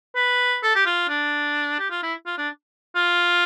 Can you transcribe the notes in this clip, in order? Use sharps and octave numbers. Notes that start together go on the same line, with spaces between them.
B4
A4
G4
F4
D4
G4
F4
E4
F4
D4
F4